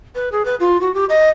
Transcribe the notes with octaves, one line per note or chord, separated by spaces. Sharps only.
B4
G#4
B4
F4
F#4
G4
D#5